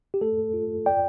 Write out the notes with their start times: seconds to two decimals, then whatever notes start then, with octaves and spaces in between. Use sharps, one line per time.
0.14 G4
0.21 A3 A4
0.53 F4
0.86 D5 G5